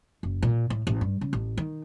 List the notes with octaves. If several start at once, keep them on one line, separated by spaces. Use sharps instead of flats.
F#1
A#2
A2
A1
G2
C#3
A1
D#3